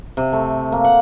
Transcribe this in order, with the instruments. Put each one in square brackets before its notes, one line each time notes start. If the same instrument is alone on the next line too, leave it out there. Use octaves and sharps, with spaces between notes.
[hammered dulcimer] C3
A3
A#3
F#5